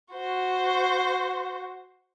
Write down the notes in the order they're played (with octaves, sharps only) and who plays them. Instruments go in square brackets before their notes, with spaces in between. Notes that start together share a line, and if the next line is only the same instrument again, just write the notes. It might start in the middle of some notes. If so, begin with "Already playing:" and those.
[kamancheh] F#4 C5